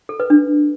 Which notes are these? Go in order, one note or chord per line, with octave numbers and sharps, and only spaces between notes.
A4
B4
D4